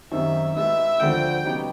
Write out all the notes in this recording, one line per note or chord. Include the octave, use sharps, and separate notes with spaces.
F#2 D#3 G3 C4 D#4 E5
B2 G#3 B3 D#4 E5
D2 D3 F3 G#3 G5
C#3 F#3 B3 D#4 G4